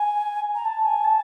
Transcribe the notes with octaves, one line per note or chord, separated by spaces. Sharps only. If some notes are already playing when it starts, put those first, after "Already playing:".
Already playing: G#5
A#5
A5
G#5
A5